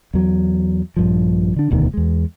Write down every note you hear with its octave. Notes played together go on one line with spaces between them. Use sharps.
E2 F#3
A#1 G2 F3
D3 D4
E1 D2 B2 D#3
E2 G#3